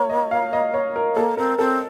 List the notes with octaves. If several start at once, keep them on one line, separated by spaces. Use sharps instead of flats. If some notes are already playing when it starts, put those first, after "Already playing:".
Already playing: A#3 C#5
D#5
F5
D#5
C#5
A#4
A#3 A4
C4 A#4
C4 A4